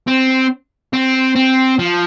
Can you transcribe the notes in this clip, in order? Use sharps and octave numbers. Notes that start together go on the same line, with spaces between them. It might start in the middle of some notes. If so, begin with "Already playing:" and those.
C4
C4
C4
F3